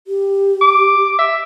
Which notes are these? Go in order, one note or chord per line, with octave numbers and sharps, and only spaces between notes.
G4
D6
E5